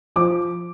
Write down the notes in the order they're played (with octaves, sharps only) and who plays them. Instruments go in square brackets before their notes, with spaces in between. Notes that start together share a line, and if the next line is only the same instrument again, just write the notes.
[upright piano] F3 D6